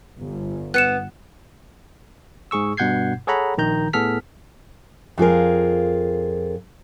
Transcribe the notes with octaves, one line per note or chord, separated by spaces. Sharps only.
G1
B3 F#6 C#7 E7
G#2 G#4 C#6 E6
G2 B2 F#5 G6 G#6 C7
G#4 A4 C#5 F#5 A#5 B5
A#1 D#3 A#5 G6
A2 B3 G#4 A4 F6 B6
F2 F4 G#4 A#4